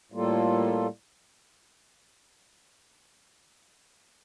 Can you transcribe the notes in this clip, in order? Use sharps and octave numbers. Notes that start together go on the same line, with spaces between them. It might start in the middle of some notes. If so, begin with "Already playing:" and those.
A2 G3 A#3 F4 A4